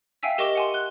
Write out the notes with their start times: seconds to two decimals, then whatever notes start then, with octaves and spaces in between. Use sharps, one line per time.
0.23 E5 F5 G5 G#5 E6 B6
0.38 G4 A#4 D#5 C#6 D6 E7
0.55 F#5 G#5 C6
0.74 F#6 G7